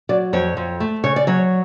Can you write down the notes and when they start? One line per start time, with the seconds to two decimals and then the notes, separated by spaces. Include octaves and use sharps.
0.09 F#3 D5
0.33 F2 C#5
0.57 F2
0.80 A3
1.04 C#3 C#5
1.16 D5
1.27 F#3 C#5